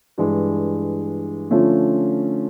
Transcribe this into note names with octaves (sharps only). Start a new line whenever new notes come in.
G2 E3 G#3
D3 F3 A3 C#4 F4